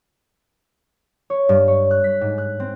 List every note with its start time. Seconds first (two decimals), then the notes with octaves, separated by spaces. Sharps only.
1.30 C#5
1.49 G2
1.68 C#5
1.91 F#6
2.04 B6
2.21 G#2
2.38 F#6
2.60 C4